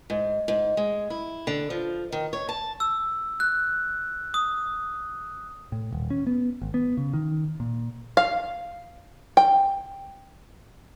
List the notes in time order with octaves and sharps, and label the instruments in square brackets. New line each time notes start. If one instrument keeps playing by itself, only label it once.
[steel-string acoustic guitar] G#2
G#2
G#3
E4
D3
F3
D#3
C#5
A5
[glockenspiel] E6
F#6
D#6
[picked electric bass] A2
D#1
C#4
B3
G#1
B3
C#3
D#3
A#2
[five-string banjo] F5
G5